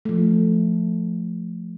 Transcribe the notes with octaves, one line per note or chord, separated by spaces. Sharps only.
F3 A3